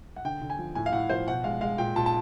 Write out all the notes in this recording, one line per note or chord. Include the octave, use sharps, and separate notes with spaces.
F#5
D3 G5
D3
G#5
F3
A2 G#5
F5
A2 F#5
F3 C5
B2 F#5
G#3 F5
G#3 F5
A#2 G5
A#2 A5
A5